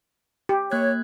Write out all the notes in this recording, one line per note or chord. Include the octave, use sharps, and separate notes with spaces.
G4
A#3 C#5 F#6 G#6